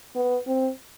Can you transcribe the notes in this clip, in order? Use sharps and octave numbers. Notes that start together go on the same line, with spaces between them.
B3
C4